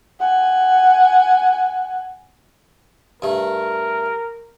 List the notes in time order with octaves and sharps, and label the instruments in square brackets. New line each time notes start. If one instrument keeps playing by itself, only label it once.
[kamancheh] F#5 G#5
[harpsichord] G2 A3 [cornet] A#4